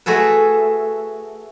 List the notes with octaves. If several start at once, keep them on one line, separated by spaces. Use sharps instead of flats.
A3 F#4 G#4 A4 B4